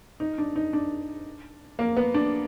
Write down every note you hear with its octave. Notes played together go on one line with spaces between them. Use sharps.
D#4
D4
D#4
D4
A#3
B3
D4